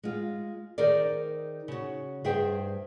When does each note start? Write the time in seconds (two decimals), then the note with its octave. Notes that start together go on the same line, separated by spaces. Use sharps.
0.03 G#3 F4
0.78 D#3 D#4 G#4 A#4 C5 D5
1.68 C#3 F#4
2.24 G2 G#4 C5 E5 G5